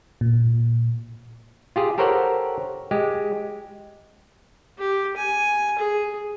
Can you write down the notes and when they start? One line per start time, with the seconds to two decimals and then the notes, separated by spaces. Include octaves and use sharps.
0.21 A#2
1.76 F4 G4 G#4
1.98 G4 A4 A#4 C5 C#5 F#5
2.91 G#3 G4
4.79 G4
5.17 G#5
5.79 G#4